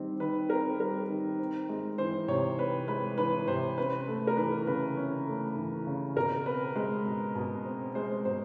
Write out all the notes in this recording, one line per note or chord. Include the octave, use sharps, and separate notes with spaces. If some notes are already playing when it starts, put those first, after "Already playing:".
Already playing: D#3 G3 C4
D#3 B4
C4 A#4
G3 A#4
D#3
C4
G#3
E3 C5
C3 C#5
C4 B4
G#3 B4
E3 B4
C3 C5
C#4 B4
A3
A#4
E3 B4
C#3 B4
C#4
A3
E3
C#3
B2 A#4
C4 B4
G#3
B2
B2
C4
G#3 C5
B2 C5